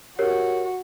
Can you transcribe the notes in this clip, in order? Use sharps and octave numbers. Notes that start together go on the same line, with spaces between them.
F#4 G4 A#4 C#5